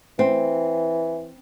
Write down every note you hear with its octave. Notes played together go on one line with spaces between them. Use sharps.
E3 C4